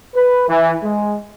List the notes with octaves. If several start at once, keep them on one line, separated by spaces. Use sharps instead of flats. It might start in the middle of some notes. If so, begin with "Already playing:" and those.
B4
E3
G#3